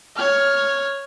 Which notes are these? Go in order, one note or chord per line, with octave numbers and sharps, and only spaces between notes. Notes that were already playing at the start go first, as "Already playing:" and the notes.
C#5 F6